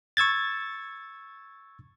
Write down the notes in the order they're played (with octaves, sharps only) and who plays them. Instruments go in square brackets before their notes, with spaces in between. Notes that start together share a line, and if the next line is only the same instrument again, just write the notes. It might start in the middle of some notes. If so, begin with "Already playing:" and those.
[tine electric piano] C#6 E6 G#6 A6